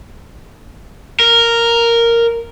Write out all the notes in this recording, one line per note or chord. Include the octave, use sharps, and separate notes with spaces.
A#4